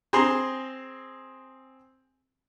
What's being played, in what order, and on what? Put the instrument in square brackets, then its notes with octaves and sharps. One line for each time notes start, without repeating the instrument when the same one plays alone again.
[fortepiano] C4 G#4 A#5 C6